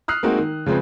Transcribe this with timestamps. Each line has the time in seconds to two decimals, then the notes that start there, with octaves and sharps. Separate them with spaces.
0.08 D#6 F6 F#6 C7
0.23 G#3 A#3 C4 D#4 F#4
0.38 D#3
0.66 C#3 F3 G#3 C4 B4